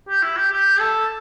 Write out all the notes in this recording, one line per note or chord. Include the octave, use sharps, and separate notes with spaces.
G4
E4
G4
G4
A4